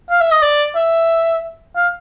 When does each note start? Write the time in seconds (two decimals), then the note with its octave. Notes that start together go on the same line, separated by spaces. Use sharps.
0.10 F5
0.21 E5
0.31 D#5
0.43 D5
0.76 E5
1.76 F5